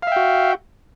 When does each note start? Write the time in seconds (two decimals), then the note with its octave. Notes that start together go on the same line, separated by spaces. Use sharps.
0.03 F5
0.07 E5
0.12 G5
0.16 F#4